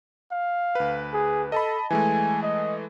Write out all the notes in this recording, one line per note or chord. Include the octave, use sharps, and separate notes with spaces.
F5
D2 B4
G#4
A4 D#5 A5 B5
E3 G#3 A3 G#5
D#5